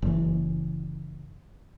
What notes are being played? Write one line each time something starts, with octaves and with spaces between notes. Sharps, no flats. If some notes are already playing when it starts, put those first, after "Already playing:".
F#1 E3